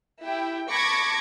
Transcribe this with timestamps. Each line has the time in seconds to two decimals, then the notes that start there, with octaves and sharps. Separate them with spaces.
0.23 E4 G4 G5
0.70 A5 B5 C#6 D6 G#6 A#6